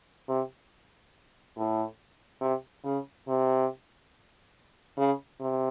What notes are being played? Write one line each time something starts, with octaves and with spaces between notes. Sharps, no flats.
C3
A2
C3
C#3
C3
C#3
C3